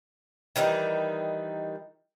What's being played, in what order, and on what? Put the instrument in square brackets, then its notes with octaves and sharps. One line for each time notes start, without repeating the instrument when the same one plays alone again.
[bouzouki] D#3 E3 G3 D#4